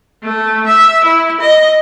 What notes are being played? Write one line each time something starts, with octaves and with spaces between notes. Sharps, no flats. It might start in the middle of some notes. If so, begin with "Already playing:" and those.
A3
E5
E4
D#5